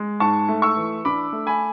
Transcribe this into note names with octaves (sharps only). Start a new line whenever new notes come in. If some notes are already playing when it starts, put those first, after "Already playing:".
Already playing: G#3
G#2 A5 C#6
A3
C#6 E6
E3
D4 B5 D6
A3
G#5 B5